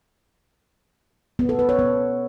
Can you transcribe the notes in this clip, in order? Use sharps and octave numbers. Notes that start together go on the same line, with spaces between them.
B3
A4
B4
C#5
B3